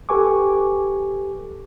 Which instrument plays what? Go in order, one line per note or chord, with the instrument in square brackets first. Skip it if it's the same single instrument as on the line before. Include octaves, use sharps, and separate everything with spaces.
[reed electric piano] G4 A4 B4 G#5 C#6 D6